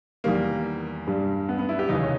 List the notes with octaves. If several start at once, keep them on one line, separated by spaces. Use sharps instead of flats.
E2 D#3 G3 A#3
G2 G3
B3
B3
E4
G4
D#2 C#3 E3 D#4
C#4